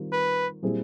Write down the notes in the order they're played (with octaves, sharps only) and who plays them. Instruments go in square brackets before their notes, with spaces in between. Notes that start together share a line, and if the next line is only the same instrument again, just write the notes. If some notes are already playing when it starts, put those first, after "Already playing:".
Already playing: [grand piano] D#3 G3 C4 F4
[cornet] B4
[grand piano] A#2 G3 C4 E4 G#4